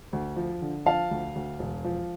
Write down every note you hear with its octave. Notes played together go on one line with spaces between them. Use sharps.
D2
F3
D3
F3 F5 A5
D2
D2
E1
F3